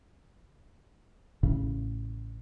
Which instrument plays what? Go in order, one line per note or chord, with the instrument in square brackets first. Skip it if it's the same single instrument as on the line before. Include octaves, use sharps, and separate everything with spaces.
[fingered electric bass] A1 A2 C#3